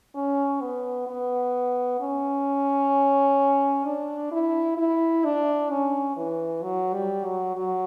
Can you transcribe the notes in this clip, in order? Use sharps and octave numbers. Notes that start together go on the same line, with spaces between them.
C#4
B3
B3
C#4
D4
E4
E4
D4
C#4
E3
F#3
G3
F#3
F#3